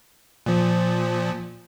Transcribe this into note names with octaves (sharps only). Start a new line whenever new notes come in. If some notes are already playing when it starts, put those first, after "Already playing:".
A#2 F3